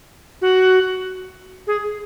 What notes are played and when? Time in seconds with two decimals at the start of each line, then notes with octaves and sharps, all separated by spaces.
0.41 F#4
1.67 G#4